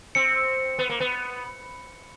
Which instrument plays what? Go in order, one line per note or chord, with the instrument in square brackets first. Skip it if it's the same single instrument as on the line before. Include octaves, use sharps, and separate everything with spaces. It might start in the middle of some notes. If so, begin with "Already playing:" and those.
[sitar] C4 [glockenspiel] C#7
[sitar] B3
A#3
B3